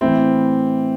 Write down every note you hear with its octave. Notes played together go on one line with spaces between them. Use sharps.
A2 E3 C4 E4